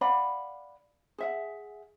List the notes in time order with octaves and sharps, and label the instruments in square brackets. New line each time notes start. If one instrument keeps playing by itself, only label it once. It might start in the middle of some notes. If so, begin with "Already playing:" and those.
[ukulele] D5 F5 F#5 B5
G#4 E5 F#5